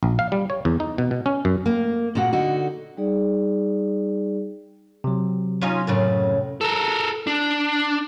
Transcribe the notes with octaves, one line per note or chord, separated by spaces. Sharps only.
A#1
F5
G3
C#5
E2
D#4
B2
B2
C#4
F#2
A#3
A#2 G#3 A#3 F#4 F#5
D3 D#4 F#4
G3 D#4 G#4 D5
C3 F#3
C#4 D#4 F4
F#2 A2 C#3
A4 A#4
D4